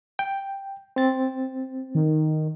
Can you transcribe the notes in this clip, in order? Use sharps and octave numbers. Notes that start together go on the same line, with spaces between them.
G5
C4 A6
D#3